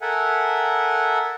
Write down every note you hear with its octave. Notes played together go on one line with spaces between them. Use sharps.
A4 A#4 E5 F#5 G#5